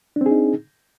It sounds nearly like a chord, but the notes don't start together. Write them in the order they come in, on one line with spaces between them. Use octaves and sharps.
D4 C4 G#4 D#4